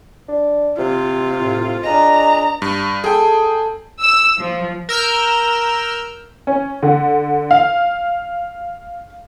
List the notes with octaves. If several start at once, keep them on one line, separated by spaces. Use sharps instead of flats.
D4
C3 F4
A2
D4 G#4 B4 D#5 A#5
G2
G#4 A4 G5
E6
F3
A#4 E6 F6 G6
C#4
D3
F5